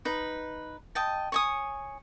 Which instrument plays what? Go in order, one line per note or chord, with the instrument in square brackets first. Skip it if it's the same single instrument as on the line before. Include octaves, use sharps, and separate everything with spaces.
[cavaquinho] D#4 B4
D#5 G5 A5
C#5 G#5 D#6